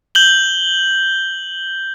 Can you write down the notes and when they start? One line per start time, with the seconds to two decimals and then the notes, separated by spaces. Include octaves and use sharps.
0.15 G6 F#7 G7